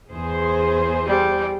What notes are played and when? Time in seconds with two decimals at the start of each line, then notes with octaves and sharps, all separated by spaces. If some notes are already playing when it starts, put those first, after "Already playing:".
0.11 E2 G#4 C5
1.06 G3